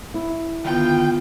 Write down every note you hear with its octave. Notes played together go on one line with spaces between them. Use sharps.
E4
D3 D#3 B3 F4 G5